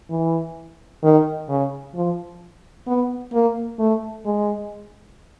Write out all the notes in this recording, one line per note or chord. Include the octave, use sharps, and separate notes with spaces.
E3
D#3
C#3
F3
B3
A#3
A3
G#3